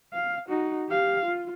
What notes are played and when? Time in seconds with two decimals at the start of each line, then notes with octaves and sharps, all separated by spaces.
0.14 F5
0.49 D#4 F#4
0.89 G4 F5
1.25 F4